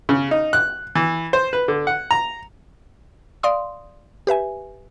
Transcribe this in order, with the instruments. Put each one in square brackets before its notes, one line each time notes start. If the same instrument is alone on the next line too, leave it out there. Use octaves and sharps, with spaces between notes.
[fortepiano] C#3
D#4
F#6
E3
C5
B4
D3
F#5
A#5
[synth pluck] D5 F5 C6 D#6
G4 B4 E5 G#5